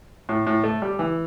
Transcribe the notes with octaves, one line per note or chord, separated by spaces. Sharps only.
A2
A2
A3
G3
E3